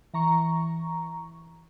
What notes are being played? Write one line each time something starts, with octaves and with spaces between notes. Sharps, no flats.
E3 A#5 C#6